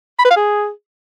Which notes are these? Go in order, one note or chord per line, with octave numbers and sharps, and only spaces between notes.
B5
B4
F5
G#4